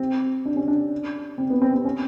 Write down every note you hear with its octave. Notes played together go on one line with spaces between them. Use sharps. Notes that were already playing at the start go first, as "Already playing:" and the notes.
Already playing: C4
D4
C#4
D4
C4
B3
C4
C4
C#4